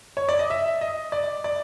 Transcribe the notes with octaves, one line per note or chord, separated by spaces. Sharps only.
C#5
D5
D#5
E5
D#5
D5
D5